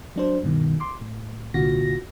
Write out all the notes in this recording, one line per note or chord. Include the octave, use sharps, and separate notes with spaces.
F#3 D4 C5
G2 B2 D#3
C6 D6
A2
C2 A#2 D3 F4 F#4 A#6